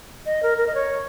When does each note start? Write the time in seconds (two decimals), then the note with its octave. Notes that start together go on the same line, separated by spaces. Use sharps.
0.26 D#5
0.43 A#4
0.58 A#4
0.67 D#5
0.75 C#5